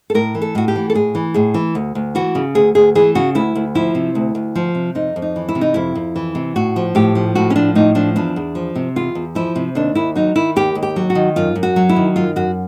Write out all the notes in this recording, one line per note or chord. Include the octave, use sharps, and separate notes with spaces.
A4
A2 A#4
E3
A4
A2 F#4
G4
E3
A4
A2 G#4
E3
A2 G#4
E3
D2
D2
E3 F#4
C#3
D2 G#4
D2 G#4
E3 G#4
C#3 F#4
D2 E4
D2
F3 E4
C3
D2
D2
F3
C3
F2 D#4
F2
D#4
E3
E4
C3
D#4
F2 E4
F2
E3
C3
A2 F#4
F3
A2 G4
F3
A2 F#4
C#4
F3 D4
A2 D#4
F3 D4
E2 D4
E2
F3
C3
E2 F4
E2
F3 E4
C3
D#2 D4
D#2 E4
F#3 D#4
D#3 E4
D#2 G4
D#2
G4
F#3
F#4
D#3
F#2 F4
F#2
F#4
F#3
E4
D#3
F#2 F4
F#2 F#4